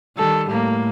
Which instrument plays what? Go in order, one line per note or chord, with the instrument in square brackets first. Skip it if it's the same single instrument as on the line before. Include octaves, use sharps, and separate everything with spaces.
[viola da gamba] D#3 G3 [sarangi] A4
[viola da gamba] A2 [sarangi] A#3